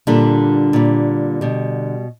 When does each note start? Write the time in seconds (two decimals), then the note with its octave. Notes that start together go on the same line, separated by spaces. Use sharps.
0.07 A#2 D3 G3 D4
0.73 A#2 G3
1.41 B2 G3